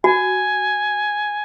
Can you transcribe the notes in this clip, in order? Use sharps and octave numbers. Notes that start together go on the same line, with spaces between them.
F#4 G#5